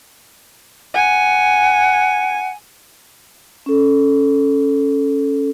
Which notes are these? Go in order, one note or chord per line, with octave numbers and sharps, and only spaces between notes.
F#5 G#5
C#4 A4